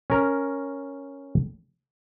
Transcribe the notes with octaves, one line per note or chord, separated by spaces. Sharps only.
C#4 A#4 A#5